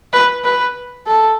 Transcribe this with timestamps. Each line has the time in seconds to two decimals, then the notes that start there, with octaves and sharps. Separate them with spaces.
0.13 B4
0.44 B4
1.06 A4